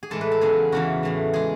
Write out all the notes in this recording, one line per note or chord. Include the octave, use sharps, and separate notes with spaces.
G#4
A2 E3 G#3 A4
B4
A4
E2 C#3 F#3 G#4
E2 C#3 E3 F#4
A2 E3 A3
G#3 G#4